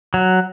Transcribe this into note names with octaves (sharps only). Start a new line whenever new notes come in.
F#3